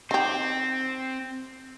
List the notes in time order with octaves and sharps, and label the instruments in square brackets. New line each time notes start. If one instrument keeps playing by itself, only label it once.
[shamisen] D#3 G4 [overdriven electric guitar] C4